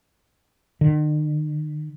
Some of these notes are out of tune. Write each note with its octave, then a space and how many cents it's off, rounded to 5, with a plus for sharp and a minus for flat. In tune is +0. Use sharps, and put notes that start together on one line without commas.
D#3 -45